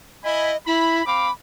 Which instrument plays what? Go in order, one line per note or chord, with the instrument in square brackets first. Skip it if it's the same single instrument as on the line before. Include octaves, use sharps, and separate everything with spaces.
[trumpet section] E4 G#5 B5 [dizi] D#5
[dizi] E4 [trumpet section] B5
[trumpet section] C4 F5 D6 [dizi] B5